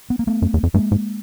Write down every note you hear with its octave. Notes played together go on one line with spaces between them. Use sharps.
B3
A#3
A3 B3
F#2
E2
F2
G2 G#3 A#3
G#2